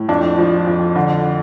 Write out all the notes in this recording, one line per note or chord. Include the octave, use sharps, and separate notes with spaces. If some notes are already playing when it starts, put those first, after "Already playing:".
Already playing: A2
F2 D4
F3
F2
D3